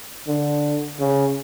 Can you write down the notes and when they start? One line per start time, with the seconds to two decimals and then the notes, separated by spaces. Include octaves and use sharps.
0.28 D3
1.00 C#3